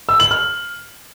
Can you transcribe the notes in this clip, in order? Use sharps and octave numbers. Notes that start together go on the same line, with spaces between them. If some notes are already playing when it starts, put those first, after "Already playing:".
E6
F#7
F6